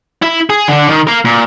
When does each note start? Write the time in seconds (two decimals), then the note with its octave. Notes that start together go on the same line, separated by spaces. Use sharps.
0.22 E4 E5
0.50 G#4
0.68 D3 D4
0.89 D#3
1.07 A#4 F5
1.25 A#2